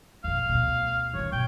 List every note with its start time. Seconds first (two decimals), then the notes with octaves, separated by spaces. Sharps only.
0.24 F2 B2 F5
0.49 D2 B2
1.15 D#3 F4 C#5
1.32 B2 G5